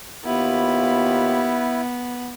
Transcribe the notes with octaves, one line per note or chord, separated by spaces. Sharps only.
D#2 B3 E4 F4 G4